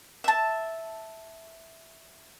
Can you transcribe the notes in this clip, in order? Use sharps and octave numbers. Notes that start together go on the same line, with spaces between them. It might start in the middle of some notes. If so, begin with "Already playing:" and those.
E5 A5